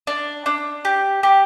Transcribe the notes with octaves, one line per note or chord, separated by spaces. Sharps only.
D4
D4
G4
G4